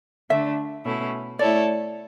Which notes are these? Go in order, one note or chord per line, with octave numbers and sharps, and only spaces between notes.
D3 A3 D4 E5
B2 A3 C#4 E4
A3 E4 A4 C#5 D5